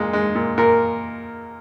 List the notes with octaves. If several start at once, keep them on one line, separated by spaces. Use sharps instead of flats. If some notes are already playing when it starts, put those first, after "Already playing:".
Already playing: A#2 G#3
G#3
A#2
A#2 A#4